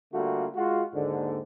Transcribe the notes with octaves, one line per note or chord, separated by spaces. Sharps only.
D3 G3 A3 A#3 F4 F#4
G#3 F4 F#4
D#2 G#2 D3